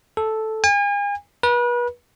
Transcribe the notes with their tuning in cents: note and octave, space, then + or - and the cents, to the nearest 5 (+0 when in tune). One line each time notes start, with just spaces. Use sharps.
A4 -5
G#5 -40
B4 -35